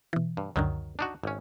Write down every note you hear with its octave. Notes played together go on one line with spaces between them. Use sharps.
B2 E3
G2
C#2 F#2 D3 D#3 F#3
D4 D#4 F#4
G#1 C#4